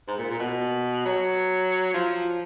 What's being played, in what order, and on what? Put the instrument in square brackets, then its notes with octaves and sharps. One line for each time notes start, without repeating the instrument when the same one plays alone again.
[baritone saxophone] G#2
A#2
A#2
B2
F#3
F3